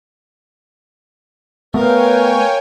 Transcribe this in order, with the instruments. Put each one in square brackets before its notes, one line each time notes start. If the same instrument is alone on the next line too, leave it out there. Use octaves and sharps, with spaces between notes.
[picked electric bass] A3 B3 [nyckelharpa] A#4 F5 [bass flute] B4 [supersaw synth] C#5 G5 G#5